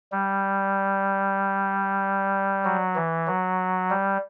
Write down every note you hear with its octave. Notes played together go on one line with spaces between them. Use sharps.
G3
F#3
E3
F#3
G3